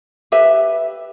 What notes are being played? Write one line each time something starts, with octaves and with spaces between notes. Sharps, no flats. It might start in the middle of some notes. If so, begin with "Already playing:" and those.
G4 B4 E5